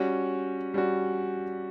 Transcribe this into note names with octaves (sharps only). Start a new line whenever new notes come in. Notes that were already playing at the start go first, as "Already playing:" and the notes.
Already playing: G3 C#4 F#4
G3 C#4 F#4